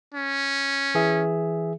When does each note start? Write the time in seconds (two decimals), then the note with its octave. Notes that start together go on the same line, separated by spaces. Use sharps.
0.15 C#4
0.95 E3 G#4 E5